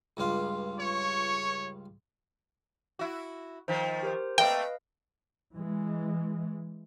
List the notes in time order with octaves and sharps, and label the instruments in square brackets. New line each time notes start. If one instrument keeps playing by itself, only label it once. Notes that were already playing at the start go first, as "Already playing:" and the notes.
[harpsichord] C#2 G2 F4
[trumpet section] C#5 [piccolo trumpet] C#6
[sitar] E4 F#4
[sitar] D#3 F3 [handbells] C5 B6 C7
[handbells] G4 A#4 C5
[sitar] A3 A#3 C4 [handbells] B4 D#5 F5 [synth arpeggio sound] G5
[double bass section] E3 G#3